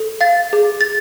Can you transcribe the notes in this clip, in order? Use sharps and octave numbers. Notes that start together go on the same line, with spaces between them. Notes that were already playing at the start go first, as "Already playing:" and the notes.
Already playing: A4
F5 A6
G#4
A6